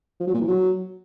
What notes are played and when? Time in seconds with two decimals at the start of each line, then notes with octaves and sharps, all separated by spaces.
0.20 F3
0.27 F#3
0.34 A#2
0.41 E3
0.48 F#3